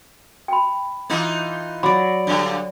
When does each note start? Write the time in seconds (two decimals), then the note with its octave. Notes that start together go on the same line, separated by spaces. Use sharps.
0.48 G5 B5
1.10 E3 D#4 F4
1.83 F#3 D5 B5 D6
2.27 G2 D3